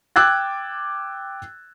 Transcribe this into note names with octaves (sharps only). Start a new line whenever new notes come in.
G5 D6 E6 F#6 G#6 A6